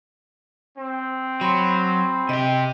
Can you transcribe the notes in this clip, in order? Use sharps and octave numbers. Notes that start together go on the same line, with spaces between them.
C4
F#3 B5 C6
C3 G4 D#5